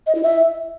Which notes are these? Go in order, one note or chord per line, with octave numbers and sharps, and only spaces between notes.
D#5
E4
E5